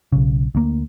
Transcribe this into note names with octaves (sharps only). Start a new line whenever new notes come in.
B1 C#3
D2 A#3